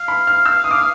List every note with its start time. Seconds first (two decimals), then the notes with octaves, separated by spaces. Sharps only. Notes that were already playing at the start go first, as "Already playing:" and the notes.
Already playing: F5
0.08 B5
0.27 F6
0.45 E6
0.64 D#6
0.71 D6
0.78 D#6